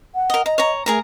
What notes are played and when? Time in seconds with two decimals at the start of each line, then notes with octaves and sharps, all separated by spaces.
0.15 F#5
0.30 A#4 D#5
0.46 D#5 A#5
0.58 C#5 A#5
0.86 A3 G#4 A#4 A#5